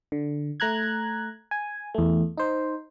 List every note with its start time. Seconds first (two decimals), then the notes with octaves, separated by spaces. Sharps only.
0.12 D3
0.60 A3 A#5 F#6 G#6
1.51 G#5
1.95 E2 A3
2.38 D#4 C5